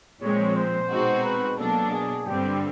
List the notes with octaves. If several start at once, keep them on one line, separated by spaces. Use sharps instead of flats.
A#2 F3 G#3 C4 C#5
C5
B2 G#3 C4 D#4 F#4
B4
B2 F#3 A#3 D4 A4
G#4
G2 D3 G3 C4 G4